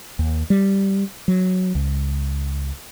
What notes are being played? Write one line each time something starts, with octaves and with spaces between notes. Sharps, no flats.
D#2
G3
F#3
C#2